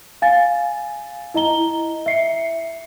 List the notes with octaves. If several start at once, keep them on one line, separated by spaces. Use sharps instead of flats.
F5 G#5 A6
E4 D#5 A#5 G7
E5 C7 C#7